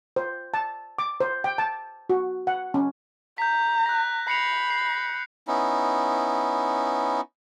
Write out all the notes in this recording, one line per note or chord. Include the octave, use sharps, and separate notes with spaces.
C5
A5
D6
C5
G5
A5
F#4
F#5
C#4
A#5 G6 B6
F#6 A#6
B5 C7 C#7 F7
C7
B3 C#4 D#4 E4